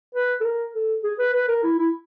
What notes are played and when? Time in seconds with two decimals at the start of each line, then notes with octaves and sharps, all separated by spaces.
0.15 B4
0.41 A4
0.45 A#4
0.75 A4
1.03 G#4
1.19 B4
1.33 B4
1.48 A#4
1.63 E4
1.78 E4